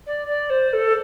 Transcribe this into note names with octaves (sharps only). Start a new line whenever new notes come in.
D5
D5
C5
A4